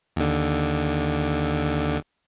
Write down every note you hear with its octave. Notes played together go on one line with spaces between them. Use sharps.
D#2 D3